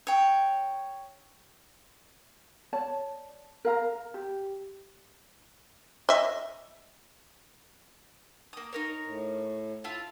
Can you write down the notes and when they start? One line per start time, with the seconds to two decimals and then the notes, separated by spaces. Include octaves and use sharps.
0.07 C#5 G5
2.73 C#5 D5 A5
3.65 A#4 F5 A#5
4.14 G4
6.09 D#5 E5
8.53 A#3 D#6
8.73 D#4 A#4 C#5
9.04 A2
9.84 E4 F4 A5